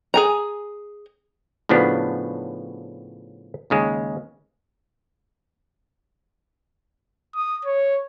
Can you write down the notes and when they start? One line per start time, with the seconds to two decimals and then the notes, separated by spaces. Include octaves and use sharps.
0.14 G#4 G#5 A#5
1.69 A2 C#3 F3 B3 D4 F#4
3.70 D#2 C#3 G#3
7.36 D#6
7.65 C#5